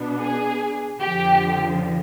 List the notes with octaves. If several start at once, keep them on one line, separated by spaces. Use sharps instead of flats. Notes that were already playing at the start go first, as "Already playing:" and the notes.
Already playing: B2 B3 D4
G#4
F2 D3 F3 G4